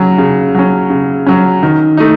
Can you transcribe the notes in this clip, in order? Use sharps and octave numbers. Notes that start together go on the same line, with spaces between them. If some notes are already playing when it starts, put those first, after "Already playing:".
Already playing: C#3 F#3 C#4
C#3
F#3 C#4
C#3
F#3 C#4
D#3
A3 D#4